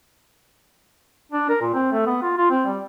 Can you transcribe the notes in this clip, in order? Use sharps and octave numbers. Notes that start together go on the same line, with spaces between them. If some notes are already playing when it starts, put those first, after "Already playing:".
D4
A#4
A#2
C4
A3
B3
F4
F4
C4
G3